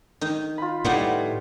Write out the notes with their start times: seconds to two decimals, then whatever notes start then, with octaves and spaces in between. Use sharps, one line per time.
0.21 D#3 D#4
0.58 F4 B5
0.84 A2 G3 B3 D#4